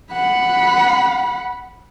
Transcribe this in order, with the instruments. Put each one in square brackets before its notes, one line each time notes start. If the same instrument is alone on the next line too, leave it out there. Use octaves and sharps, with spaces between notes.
[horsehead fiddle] F#5 B5